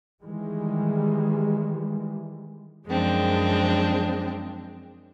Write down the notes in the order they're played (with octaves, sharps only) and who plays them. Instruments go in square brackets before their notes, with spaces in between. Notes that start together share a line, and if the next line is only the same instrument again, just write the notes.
[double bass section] D#3 E3 G3 G#3
[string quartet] F#2 F3 G#3 C4 D4